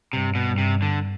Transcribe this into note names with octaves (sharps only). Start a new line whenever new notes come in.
G2 C3
B2
G2
C3
D3